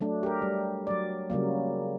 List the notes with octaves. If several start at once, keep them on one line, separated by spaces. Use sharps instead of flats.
F#3 A3 D4
G4 A#4
G3
F#3 D5
C#3 F#3 G3 A#3